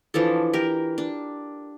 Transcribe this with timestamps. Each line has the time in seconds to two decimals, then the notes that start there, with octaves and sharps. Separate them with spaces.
0.14 E3 F3 D4 A4
0.53 G4 A#4
0.98 D4